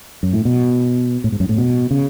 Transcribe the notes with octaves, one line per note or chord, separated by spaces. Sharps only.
F#2
A2
B2
A2
G#2
F#2
A2
B2
C#3